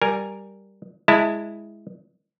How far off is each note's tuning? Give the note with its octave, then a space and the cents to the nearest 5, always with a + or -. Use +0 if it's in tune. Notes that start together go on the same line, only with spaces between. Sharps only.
G3 +0 A#4 +0 G#5 +0
G#3 +0 E4 +0 A5 +30